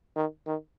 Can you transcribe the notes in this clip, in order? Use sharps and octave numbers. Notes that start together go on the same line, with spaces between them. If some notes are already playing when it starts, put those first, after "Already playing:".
D#3
D#3